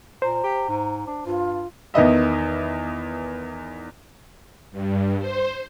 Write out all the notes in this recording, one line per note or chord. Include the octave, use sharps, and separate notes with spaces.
A#2 C5 A#5
G4
G#2
D4
G2 F4
E2 D#3 B4 D#5 E5
G2
C5